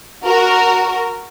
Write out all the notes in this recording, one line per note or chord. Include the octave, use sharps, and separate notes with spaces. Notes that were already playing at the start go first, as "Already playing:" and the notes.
F#4 A#4